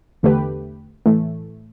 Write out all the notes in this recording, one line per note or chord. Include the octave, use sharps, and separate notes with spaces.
E2 D3 A3 G4 B4
A2 E3 A3